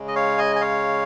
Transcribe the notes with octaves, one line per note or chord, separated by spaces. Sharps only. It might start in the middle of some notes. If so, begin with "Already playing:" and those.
Already playing: C#3 G#3
D#5
C#5 F5
D#5 G#5
G#5
C#5 F5